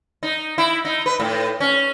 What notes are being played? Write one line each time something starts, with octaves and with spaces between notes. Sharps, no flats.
D#4
E4
D#4
B4
A2
C#4